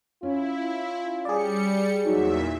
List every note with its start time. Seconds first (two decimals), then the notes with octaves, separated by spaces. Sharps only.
0.23 C#4 E4 F4
1.25 G3 G#4 D5 C#7
2.05 E2 A#2 F#3 D#4 F#4 E5